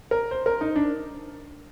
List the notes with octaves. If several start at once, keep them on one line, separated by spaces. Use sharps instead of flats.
A#4
C5
A#4
D#4
D4